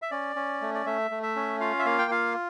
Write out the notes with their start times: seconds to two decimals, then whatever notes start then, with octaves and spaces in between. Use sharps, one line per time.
0.02 E5
0.11 C#4 D5
0.36 C#4
0.61 A3
0.74 D5
0.86 A3 E5
1.11 A3
1.23 E5
1.36 C#4
1.61 F4 F5
1.79 E5
1.86 A#3 F5
1.99 G5
2.11 F4 F5